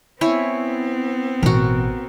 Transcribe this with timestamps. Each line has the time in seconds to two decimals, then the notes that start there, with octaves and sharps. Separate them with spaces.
0.21 B3 C4 E4 C#5 G#5
1.43 A1 B2 F#4 A#4